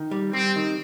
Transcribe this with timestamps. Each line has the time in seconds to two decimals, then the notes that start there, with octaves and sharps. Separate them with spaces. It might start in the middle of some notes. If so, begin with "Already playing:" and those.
Already playing: D#3
0.11 G3
0.33 G3 C4
0.56 D#3